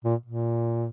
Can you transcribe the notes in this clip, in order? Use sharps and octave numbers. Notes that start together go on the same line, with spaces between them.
A#2
A#2